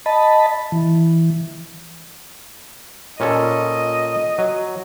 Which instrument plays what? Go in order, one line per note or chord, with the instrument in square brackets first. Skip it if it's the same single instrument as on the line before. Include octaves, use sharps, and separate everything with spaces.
[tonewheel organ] D#5 A5 B5
E3
[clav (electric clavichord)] A#2 C#4 A4 [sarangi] D#5
[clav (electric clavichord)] F#3